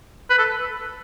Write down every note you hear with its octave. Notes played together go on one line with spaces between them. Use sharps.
B4
A4